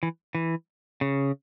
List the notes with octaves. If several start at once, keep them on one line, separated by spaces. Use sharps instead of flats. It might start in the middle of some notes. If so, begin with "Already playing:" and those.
E3
E3
C#3